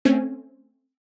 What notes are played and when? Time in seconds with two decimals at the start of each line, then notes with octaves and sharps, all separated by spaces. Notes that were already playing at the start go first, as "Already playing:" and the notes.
0.05 A3 C4 C#4 G#5